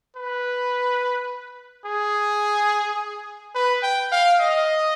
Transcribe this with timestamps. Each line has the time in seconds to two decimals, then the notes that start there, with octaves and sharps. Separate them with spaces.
0.16 B4
1.85 G#4
3.55 B4
3.83 G5
4.12 F5
4.40 D#5